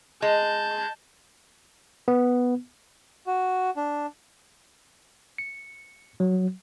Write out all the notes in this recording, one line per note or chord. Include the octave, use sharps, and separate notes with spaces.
G#3 A5 G6
B3
F#4
D4
C#7
F#3